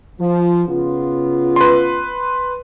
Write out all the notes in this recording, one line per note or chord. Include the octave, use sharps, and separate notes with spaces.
F3
C#3 B3 F4
B4 C6